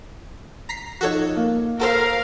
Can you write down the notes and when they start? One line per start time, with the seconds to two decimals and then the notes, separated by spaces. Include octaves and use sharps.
0.69 A#5 B6 C7
1.01 F3 D#4 F#4 A4 C#5
1.36 A#3
1.80 F#4 A4 A#4 C5 F5